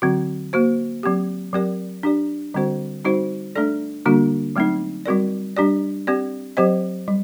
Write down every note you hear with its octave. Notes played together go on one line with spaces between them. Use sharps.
D3 F#3 C4 F#4
A#3 F#4 C5
F#3 C4 G4
F#3 C4 G4 A#4 D5
D4 G4 D5
D3 G3 C4 F#4 C5
G3 C4 D#4 F#4 C5
A3 D4 A4 D5
D3 G3 A#3 D4 F#4
F#3 A3 C4 D#4
G3 C4 F#4 A#4 D5
G3 D4 G4 D5
C4 G4 D5
F#3 C4 G4 C5 D#5
G3